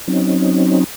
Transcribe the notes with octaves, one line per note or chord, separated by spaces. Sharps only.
F#3 C4 C#4 D#4